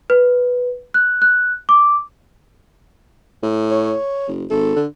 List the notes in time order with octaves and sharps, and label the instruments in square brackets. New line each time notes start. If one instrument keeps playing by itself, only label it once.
[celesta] B4
F#6
F#6
D6
[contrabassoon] A2
[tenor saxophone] C#5
[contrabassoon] F#1
[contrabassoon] G#1 [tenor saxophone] A4
[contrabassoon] D3